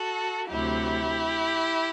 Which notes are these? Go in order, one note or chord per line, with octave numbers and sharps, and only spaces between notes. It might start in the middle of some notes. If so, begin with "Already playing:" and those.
Already playing: F#4 A4
D2 C3 F#3 E4 G4